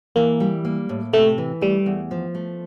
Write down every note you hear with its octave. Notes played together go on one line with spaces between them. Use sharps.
E3 A#3
G3
A#3
A2
C3 A3
E3
G3 A3
E2
F3
A3